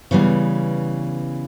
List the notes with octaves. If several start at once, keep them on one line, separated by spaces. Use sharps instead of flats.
C#3 E3 G3 B3